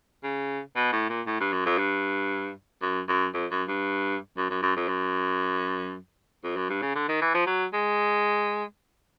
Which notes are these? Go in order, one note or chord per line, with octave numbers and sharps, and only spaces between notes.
C#3
B2
A2
A#2
A2
G2
F#2
F2
G2
F#2
F#2
F2
F#2
G2
F#2
F#2
F#2
F2
F#2
F2
F#2
G2
C#3
D3
D#3
E3
F3
F#3
G#3